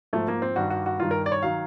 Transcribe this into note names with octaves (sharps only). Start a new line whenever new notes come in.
G#2 F3 A3
A#3
C4
G2 D#3 G3 F#4
F#4
F#4
G2 D#3 G3 F4
A#4
D5
C#5
D#3 F#3 F5